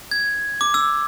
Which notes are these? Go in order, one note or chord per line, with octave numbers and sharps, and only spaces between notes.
G#6
D6
E6